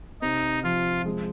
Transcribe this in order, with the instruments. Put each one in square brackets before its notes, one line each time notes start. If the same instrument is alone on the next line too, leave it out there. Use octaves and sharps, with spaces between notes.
[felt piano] C3 [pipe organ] D#4
[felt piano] F3 [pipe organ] F4
[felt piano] G#3